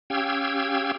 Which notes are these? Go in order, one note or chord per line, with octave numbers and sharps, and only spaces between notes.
C#4 G4 F5 G5 E6 G#6